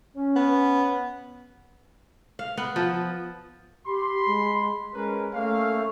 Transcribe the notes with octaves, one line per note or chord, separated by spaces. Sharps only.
C#4
B3
F5
B3
F3
G4 B5 C6
G#3
G#3 C#4 A#4 B4
A3 A#3 C#4 F5